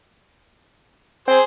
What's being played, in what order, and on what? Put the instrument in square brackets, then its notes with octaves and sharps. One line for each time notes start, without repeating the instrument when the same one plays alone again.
[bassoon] C4 [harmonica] G#4 C5